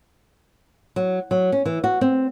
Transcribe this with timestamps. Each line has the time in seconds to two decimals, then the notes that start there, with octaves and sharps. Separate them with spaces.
0.96 F#3
1.31 F#3
1.52 C#4
1.66 E3
1.84 F#4
2.01 C4